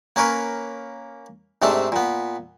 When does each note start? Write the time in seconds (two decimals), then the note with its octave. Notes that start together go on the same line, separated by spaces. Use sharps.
0.16 A#3 C#4 A#4 B4 C#5
1.62 G#2 C3 A3 D4
1.92 A#2 B3